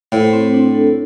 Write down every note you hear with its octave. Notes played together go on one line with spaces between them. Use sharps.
A2 C5
C4
D4
A4